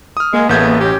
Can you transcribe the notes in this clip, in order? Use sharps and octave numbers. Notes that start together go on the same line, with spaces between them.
D#6 F6
G#3 A#3
A1 C#3 A3 B3 G6 G#6
F#2 C#4 G4